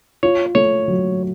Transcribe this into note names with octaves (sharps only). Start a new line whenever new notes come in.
F4 C#5
A3 C#5
F#3